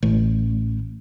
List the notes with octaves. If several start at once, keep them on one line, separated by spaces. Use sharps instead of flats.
A1